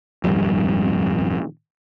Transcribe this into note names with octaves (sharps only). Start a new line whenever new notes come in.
D#1 G#1 F2 G3